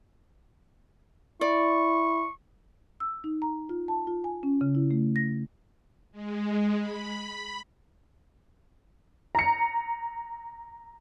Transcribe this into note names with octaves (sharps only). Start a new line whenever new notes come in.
E4 D5 C#6
E6
D#4
A#5
F4
A5
F4
G#5
C#4
C#3
E4
A3
A#6
G#3
B5
A#5 C#7